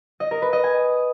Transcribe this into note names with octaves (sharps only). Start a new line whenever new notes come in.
D#5
A#4
B4
D#5
G#5